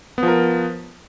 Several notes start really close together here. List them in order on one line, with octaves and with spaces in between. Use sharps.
B3 F3 A#4